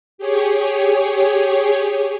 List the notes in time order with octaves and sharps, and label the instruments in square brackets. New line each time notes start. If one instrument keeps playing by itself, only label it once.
[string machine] G4 G#4 C#5